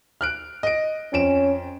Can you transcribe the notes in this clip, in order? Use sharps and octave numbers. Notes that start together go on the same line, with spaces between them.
F6 F#6 D7
D#5 D7
F2 C#4 D7 E7